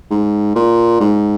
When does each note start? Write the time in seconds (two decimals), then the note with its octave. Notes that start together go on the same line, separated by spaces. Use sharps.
0.10 G#2
0.56 A#2
1.01 G#2